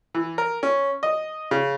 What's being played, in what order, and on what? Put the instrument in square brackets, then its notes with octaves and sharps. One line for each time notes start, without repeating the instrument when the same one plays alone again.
[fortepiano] E3
A#4
C#4
D#5
C#3